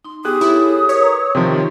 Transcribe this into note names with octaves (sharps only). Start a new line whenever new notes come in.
D#4 C6
B3 G4 G#4 D#6 F#6
E4 A4 C#5
A#4 B4 C#5
A#5
C3 D#3 F3 D#4 G4 C6